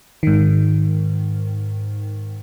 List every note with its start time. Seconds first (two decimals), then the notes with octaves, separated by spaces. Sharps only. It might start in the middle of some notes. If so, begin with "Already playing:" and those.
0.23 G#2 D#3